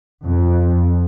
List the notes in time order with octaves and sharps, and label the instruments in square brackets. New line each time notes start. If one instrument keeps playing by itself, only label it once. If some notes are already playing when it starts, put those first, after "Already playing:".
[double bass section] F2